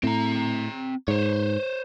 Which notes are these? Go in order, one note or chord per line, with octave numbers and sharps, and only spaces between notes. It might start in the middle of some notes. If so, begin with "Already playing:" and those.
A2 C4 A#5
G#2 C5 C#5